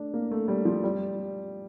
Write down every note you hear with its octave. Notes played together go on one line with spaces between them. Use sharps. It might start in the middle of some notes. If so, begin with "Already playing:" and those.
Already playing: A3 D4
A#3
A3
G3
F3
G3